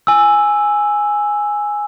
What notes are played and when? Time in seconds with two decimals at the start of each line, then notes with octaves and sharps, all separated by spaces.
0.07 G#5 E6